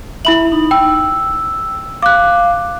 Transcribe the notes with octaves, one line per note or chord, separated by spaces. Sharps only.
E4 E5 B5 F#7
D#4
G5 E6
F5 D6 F#6